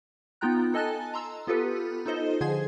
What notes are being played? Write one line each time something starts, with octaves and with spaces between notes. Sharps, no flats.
B3 D#4 F4 G5 A#5 F#6
A4 D#5 G#5 A5 F#6 A6
A#5 C6 E6
B3 F4 G4 A4 B4
D#4 F4 A4 C5 D#5
D3 F3 G#4 G#5 C6 G#6